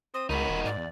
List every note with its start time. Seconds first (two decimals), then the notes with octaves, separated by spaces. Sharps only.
0.14 C4 D#6
0.30 C#2 D#3 D#4 F#4 B5
0.49 D#1
0.65 G#2 D5
0.77 E2